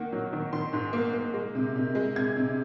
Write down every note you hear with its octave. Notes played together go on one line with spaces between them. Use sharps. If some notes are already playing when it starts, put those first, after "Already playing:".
Already playing: D#3 A#3 F#5
F#3
D#3
D#3 C6
G#2
A#3
A#3
G#3
C3
C3
G#3
C3 G#6
C3